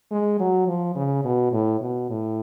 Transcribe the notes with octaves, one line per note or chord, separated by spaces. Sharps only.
G#3
F#3
F3
C#3
B2
A2
B2
A2